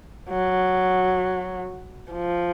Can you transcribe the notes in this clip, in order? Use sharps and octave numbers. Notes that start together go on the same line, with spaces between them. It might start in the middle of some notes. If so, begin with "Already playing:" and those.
F#3
F3